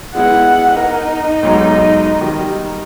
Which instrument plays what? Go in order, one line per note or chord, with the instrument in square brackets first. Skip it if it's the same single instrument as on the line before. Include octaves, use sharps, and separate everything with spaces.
[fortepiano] G#3 B3 E4 [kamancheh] F#5
[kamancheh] D#4 [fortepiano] A#4
[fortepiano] B1 G#2 F#4
D#3 G3